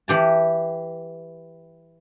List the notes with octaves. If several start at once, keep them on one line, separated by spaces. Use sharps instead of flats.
E3 G4 A5